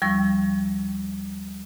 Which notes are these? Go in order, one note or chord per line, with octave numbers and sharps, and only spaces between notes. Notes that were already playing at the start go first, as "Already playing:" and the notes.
D#2 F3 G3 C#6 E6